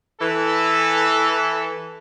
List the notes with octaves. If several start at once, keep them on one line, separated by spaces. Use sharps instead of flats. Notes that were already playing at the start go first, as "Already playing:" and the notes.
E3 A4